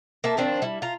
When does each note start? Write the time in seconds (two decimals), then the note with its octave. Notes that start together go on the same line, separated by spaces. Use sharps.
0.24 A#3 E5 A5
0.37 D#3 F3 C4 D4
0.62 G3 E4
0.82 F4 A#5